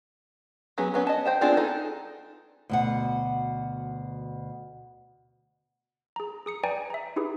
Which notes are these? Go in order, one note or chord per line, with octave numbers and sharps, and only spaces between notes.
F#3 B3 C#4 G#4
F#3 B3 C#4
D#5 A5
C5 G5 A5
B3 C4 D4 F4 G#4
D#4 A4
D2 B2 F#5
G#4 A#5
G#4 D#6 C#7
B4 D5 G5 G#5 A#5
E5 A#5
D#4 E4 G4 G#4 B4